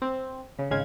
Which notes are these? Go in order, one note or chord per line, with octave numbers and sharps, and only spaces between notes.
C4
C#3
G#1 C#3 G#3 F5 G#6